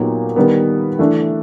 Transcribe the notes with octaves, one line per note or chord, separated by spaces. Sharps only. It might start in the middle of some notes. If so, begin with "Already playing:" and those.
Already playing: A#2 F#3 B3 D#4 G4
D#3 G3 B3
E3 A3 D4